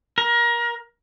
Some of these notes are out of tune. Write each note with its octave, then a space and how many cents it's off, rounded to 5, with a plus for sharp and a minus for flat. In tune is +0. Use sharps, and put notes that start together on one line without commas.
A#4 +25